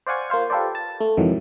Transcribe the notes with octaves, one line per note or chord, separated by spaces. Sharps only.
C5 D5 F5 F#5 G#5 C#6
A#3 F4 C5 F5
F4 G4 A4 B4 C5 D5
A5
A3
F2 G#2 C3 D#3 E3 F#3